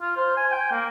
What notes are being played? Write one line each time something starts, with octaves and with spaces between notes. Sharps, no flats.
F4
C5
G#5
G5
A#3